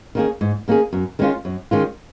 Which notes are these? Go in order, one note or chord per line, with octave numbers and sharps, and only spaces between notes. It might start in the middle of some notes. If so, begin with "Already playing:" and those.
D#3 A#3 C#4 G#4
G#2
D#3 A#3 C#4 G#4
F#2
D#3 G#3 C#4 F4
F#2
D#3 G#3 C#4 F4